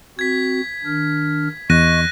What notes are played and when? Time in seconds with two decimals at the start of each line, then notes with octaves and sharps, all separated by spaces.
0.19 C4 F#4 G#6 B6
0.85 D#3 D4 F6
1.70 E2 D#5 C#6 F#6 A#6 D#7